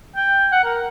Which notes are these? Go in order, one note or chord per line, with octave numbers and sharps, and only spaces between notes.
G5
F#5
A#4